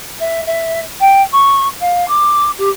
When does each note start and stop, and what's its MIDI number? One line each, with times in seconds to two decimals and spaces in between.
0.20 0.41 76
0.47 0.80 76
1.00 1.22 79
1.33 1.68 85
1.81 2.07 77
2.08 2.50 86
2.58 2.69 67